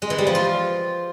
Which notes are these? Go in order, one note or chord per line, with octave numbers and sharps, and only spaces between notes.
G#3
E3
G3
F3
F4